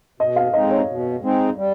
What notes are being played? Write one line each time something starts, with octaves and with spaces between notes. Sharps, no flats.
B2 D#5
F5
G#3 C4 D#4 D#5
C#5
B2
G#3 C4 D#4
G3